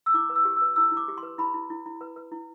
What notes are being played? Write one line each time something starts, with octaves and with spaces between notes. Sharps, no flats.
E6
E4 D6
B4
E6
G4
E6
B4
E4 E6
E4
D6
G4
C6
B4
E4 B5
E4
E4
E4
B4
B4
E4